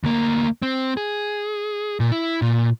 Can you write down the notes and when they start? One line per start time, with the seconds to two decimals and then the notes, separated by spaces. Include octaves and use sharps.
0.04 D2 A#3
0.62 C4
0.97 G#4
2.00 A#2
2.12 E4
2.42 A#2